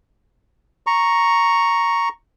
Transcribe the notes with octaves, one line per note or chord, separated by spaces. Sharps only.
A#5 C#6